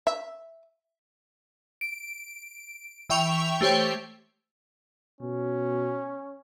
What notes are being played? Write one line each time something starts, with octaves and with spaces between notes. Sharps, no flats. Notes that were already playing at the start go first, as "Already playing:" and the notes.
E5
D7
E3 E5 G5 C#6 F7
A3 G4 C5 C#5 G5
B2 C#4